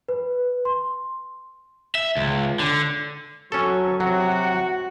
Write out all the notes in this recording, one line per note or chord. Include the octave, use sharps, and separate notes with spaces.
B4
C6
E5
C#2
D3
F#3 C#4 A4 C#6
C3 F#3 F#4 F#5